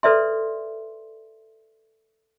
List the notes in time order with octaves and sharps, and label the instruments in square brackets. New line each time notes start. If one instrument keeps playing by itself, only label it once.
[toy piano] A4 B4 D5 E5 C6